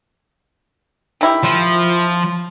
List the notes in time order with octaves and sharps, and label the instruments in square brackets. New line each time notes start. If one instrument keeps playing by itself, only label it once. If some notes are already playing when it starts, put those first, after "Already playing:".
[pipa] D#3 E4 G4
[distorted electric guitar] F3